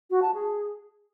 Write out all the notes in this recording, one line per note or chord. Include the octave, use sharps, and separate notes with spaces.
F#4
A5
G#4